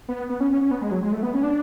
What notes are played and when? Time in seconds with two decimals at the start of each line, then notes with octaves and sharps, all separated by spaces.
0.09 B3
0.30 B3
0.40 C#4
0.50 C#4
0.61 C#4
0.71 B3
0.81 G#3
0.92 F#3
1.02 G#3
1.12 A3
1.23 B3
1.34 C#4
1.43 D4